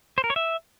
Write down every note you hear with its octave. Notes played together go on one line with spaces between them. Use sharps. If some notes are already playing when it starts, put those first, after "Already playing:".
C5
A#4
C#5
E5